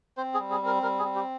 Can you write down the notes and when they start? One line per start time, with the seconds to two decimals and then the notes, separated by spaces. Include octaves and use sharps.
0.17 C4 C5
0.34 G#4
0.39 G3
0.51 G#4
0.61 C4 A#4
0.83 G3 A#4
0.99 G#4
1.04 C4
1.16 G4